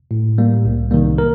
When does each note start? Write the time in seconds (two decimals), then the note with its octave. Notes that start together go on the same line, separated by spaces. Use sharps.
0.11 A2
0.38 G3 A#3
0.65 C2
0.91 C3 D#3 G3 A#3
1.18 A#4